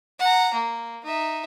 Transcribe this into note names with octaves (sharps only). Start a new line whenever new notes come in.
F#5 A#5
A#3
D#4 E5